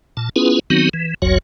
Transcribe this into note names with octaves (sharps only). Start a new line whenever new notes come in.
A#2 A5
B3 C#4 E4 F4 G#4 B4
D#3 F#3 B3 C4 D#4 F#4
E3
F#1 C2 F2 F#3 F#4 C#5